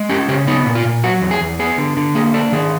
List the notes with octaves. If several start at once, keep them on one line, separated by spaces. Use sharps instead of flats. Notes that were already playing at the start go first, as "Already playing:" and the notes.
Already playing: G#3
C#4 G4
C#3 G4
B3 D#4
A#2
F4
A#2
F#3 F#4
E2
G#4
E2
B3 G#4
D3
D3
A#3 G#4
D4 A4
D#3 G#4